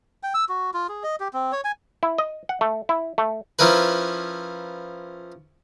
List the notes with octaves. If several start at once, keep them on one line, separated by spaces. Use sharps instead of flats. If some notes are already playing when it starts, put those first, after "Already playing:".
G5
E6
F#4
F4
G#4
D#5
G4
C4
C#5
G#5
E4
D#5
F#5
A3
E4
A3
F3 C#4 E4 A#4 B4